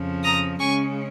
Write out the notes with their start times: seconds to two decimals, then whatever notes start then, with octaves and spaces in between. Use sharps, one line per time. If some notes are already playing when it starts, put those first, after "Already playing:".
Already playing: F2 C#3 F3
0.24 A#5 D#6
0.60 C#3 G#3 C#4 G#5 C#6